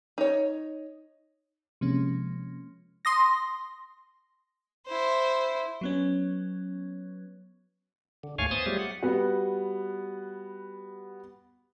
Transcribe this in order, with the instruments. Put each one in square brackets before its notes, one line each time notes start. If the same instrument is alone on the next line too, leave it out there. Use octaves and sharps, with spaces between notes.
[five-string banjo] D#4 C#5
[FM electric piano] C3 F3 G#3 A#3 C#4
[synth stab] C6 D#6 A#6
[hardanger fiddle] E4 C5
[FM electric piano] F#3 B3 C#4
[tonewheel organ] D3
D#2 G#2 A3 C#5 F5 G#5
B3 C5 G#5 D#6 A6
F#3 G3 A3 F4 G4 G#4
F#5
[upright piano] G3 B3 F#4